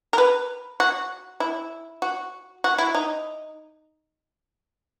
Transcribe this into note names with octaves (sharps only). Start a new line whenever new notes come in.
A#4
B4
F#4
E4
F#4
F#4
E4
D#4